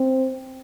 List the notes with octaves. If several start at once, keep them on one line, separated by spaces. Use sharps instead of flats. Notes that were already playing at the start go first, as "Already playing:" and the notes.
Already playing: C4